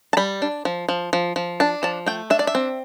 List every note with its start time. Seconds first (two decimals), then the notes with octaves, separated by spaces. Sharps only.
0.13 A5
0.17 G3 B5
0.42 D4
0.65 F3
0.89 F3
1.13 F3
1.36 F3
1.60 D4 A5
1.83 F3 A5
2.06 A3 G5
2.30 D4 E5
2.39 D5
2.47 E5
2.55 C4